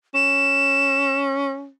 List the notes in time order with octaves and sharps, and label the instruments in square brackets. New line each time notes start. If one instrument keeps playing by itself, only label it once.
[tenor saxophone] C#4 [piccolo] E7